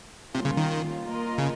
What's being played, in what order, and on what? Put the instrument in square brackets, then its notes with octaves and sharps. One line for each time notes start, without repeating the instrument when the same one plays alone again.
[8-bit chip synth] C3 [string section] G3 A#3 C#4 F4
[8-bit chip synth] C#3
D#3
[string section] A#3 F4 A#4 D#5
[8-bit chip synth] C#3